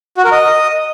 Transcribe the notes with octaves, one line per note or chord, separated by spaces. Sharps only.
F#4
A#4
D#5